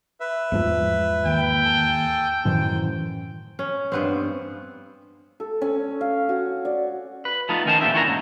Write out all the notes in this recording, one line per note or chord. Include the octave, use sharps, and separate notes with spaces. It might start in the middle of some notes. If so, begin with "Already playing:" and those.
B4 E5
E2 G#2 F3
D#2 G5
A4 G#5 A5
F#2 A2 D#3 E3 C5
C#4
G2 B3 C4
A4
C#4
F5
F#4
D5
B4
F3 A3 B3 D#4 F4
D#3 C#4 A#4 C5 A5
A#2 A3 F4 G4 E5
E3 B3 C#4 D4 B4 A#5
D#2 G#2